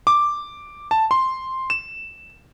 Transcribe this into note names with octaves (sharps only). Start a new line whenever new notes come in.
D6
A5
C6
E7